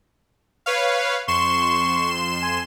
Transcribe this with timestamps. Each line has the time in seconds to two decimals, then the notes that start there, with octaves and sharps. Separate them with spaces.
0.66 B4 C#5 F5
1.28 F2 C6 C#6 E7
2.43 G#5